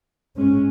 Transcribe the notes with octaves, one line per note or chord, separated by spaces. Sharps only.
G#2 G#3 C#4